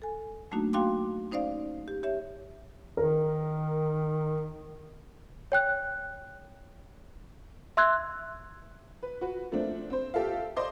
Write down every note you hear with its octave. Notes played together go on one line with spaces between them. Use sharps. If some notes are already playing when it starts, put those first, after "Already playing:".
A4 G#5
F#3 A3 A#3 D4 D#4 F#4
A#3 F#4 F5 G5 C6 D6
C#4 D#4 C5 D5 F5
G4
G4 C#5 E5
D#3 A#4
C#5 G5 F#6
E5 C6 E6 F#6 G#6
B4
F#4 B4
F3 A3 A#3 C4 D4
C4 C5
G4 A4 E5 F5
C5 D5 D#5 C6 D6